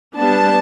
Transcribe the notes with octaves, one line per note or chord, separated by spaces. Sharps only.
G3 B3 D4 A5